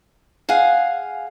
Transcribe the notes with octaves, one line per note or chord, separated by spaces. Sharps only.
G#4 F5 F#5 G#5